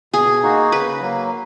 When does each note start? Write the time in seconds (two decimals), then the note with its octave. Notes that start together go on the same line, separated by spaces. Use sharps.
0.13 B2 G#4
0.42 A#3 D#4 F#4
0.72 C#3 B4
1.01 F#3 A#3